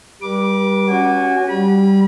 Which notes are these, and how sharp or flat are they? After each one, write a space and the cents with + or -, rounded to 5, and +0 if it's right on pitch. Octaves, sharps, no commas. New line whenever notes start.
G3 +0 B4 -45 D6 +0
C#4 +0 F#4 +0 G#5 -30
G3 -5 B5 -40